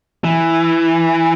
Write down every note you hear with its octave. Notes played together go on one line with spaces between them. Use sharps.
E3